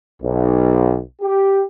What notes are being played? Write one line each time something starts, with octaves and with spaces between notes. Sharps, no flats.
B1
G4